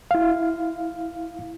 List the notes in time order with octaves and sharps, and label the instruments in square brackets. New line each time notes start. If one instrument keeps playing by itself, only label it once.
[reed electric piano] E4 F5